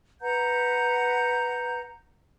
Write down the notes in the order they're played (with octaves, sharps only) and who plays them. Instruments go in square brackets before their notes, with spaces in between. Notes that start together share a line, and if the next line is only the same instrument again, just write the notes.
[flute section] B4 F#5 A#5 G6